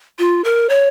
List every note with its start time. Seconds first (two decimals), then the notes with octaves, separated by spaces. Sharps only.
0.19 F4
0.44 A#4
0.69 C#5